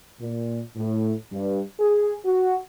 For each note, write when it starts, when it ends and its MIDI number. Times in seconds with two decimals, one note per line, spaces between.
0.21 0.60 46
0.77 1.12 45
1.33 1.61 43
1.80 2.13 68
2.26 2.56 66